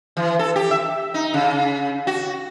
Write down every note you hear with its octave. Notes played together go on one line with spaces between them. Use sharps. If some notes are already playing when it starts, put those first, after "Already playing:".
E3
A4
G4
E5
D#4
C#3
F#4